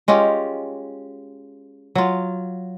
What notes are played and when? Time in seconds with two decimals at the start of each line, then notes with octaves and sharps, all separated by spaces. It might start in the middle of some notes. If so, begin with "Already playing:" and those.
0.08 G#3 C#4 F4 G4
1.95 F#3 F4